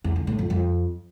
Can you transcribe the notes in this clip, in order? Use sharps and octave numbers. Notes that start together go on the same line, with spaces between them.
E2
D3
A2
F2
F2